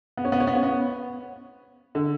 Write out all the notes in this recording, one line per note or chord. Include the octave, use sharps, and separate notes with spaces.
B3
C#4
B3
C#4
B3
C#4
B3
D3